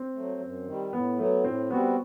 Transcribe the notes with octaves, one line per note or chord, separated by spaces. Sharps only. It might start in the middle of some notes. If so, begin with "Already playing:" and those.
Already playing: C4
F#3 A3
F#2
D#3 G3
A2 B3
F#3 A3 B3
A2 C4
G3 B3 C4 F#4